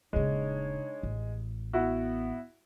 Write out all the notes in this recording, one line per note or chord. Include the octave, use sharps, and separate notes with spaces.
D#1 C#3 G#3 D4 D#4 C#5
A1
B3 E4 F#4